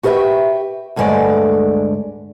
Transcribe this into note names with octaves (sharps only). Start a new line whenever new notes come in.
F#4 G4 B4 D5 E5 G5
D2 G2 D3 G#3 A3 D5